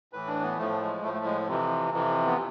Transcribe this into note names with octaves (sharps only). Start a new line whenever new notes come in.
A2 E3 B4
D4
B3
A2 F3 A3
G#3
A2 F3 A3
A3
G#3
F2 C3 E3
F2 C3 E3
B3